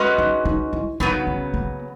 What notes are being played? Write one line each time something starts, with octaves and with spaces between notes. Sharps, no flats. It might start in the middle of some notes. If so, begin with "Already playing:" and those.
Already playing: G#3 C#4 F#4 B4 D#5
D#4
D#4
E4
C#3 F#3 B3 D#4
C#4
A#3